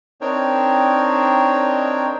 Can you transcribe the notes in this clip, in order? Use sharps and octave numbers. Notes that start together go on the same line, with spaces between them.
C4 D4 D#4 A#4 C#5 G5